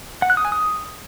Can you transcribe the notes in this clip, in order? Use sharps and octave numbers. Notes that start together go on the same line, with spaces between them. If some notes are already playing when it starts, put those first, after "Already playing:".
F#5
F#6
D#6
G#5
D#6